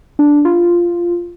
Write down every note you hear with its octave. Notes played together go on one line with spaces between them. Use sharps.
D4
F4